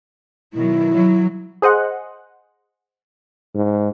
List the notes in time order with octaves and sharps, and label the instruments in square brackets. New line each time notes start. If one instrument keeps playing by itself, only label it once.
[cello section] B2 D#3 F#3 [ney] E4
[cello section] F#3
[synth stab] G#4 C5 D#5 F#5
[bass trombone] G#2